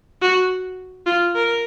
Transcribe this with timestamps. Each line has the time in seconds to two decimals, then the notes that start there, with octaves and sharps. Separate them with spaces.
0.22 F#4
1.06 F4
1.35 A#4